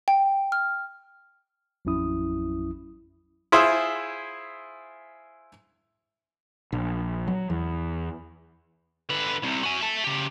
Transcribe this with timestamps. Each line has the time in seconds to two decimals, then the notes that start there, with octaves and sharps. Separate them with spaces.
0.08 G5
0.52 F6
1.85 A1 F2 F#3 C#4 E4 D#6
3.52 E4 F4 G#4 C5 E5
6.72 A#1
7.28 F#3
7.50 E2
9.10 D3 B4
9.42 C2 C3
9.63 F#4 G#5
9.81 E5 A5
10.04 C#3 G4